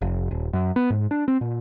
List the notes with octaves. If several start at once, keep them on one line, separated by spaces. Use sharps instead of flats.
F1
D#1
F#2
B3
G#2
D4
C4
A#2